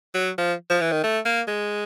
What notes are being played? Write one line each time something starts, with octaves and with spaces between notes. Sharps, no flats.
F#3
F3
F3
E3
D#3
A3
A#3
G#3